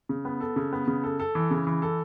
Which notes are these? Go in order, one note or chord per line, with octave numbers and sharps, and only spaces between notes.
C#3
B3
A4
C#3
B3
C#3
A4
A4
E3
C#3
E3
A4